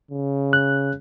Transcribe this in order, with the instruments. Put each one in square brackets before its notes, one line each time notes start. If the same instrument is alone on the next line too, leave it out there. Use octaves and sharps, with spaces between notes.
[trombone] C#3
[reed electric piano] F#6